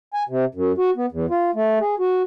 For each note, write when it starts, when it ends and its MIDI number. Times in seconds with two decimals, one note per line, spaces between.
0.14 0.23 80
0.29 0.45 48
0.55 0.72 42
0.78 0.90 66
0.96 1.06 59
1.12 1.26 40
1.31 1.51 65
1.55 1.79 57
1.81 1.95 68
1.99 2.22 66